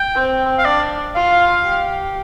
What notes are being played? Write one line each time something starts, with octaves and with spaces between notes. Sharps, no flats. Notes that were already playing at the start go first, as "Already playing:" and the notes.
Already playing: G5
C4
F5
D4 D5
F4 F5
G4